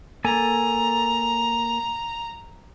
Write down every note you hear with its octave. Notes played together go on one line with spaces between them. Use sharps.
A#3 A4 G#5 A#5